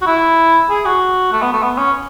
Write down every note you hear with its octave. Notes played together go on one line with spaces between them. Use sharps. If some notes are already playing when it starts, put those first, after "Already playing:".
F#4
E4
G#4
F#4
A3
B3
A3
B3
C#4